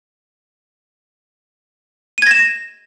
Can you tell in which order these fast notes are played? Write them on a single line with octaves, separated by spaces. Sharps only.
D#7 G#6 A#6 E7